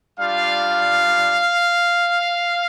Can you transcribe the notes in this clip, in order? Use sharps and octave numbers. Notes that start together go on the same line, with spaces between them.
G3 D4 F4 F5